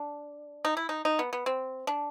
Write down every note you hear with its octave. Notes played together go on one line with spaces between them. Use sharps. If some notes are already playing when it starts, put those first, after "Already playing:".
Already playing: D4
D#4
E4
D#4
D#4
B3
B3
C4
D4